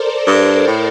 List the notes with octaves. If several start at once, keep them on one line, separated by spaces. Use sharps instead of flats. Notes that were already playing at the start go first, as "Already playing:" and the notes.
Already playing: A4 A#4 C5 D5
G2
A2